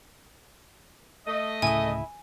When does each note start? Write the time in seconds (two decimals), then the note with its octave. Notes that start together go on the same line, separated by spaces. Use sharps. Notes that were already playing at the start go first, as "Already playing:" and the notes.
1.27 A3 D#5
1.62 D1 A2 C#3 E4 G#5 D#6